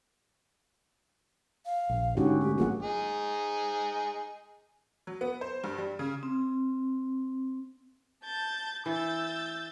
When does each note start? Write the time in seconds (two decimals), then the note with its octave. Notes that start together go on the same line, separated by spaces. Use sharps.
1.66 F5
1.89 A#1
2.17 G#2 D3 C#4 D#4 F#4 G4
2.41 A3 G4
2.58 G#1 F#3 A#3 F4 G#4 F#5
2.83 D#4 G#4
5.07 F#3
5.21 B3
5.41 C5
5.64 G2
5.78 G3
5.99 C#3
6.23 C4
8.23 A5 G6 A6
8.86 E3 E6 G6 A6